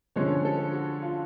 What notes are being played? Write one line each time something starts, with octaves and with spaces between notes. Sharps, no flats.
D3 F3 G#3 C#4 C#5
A4
F#4
F4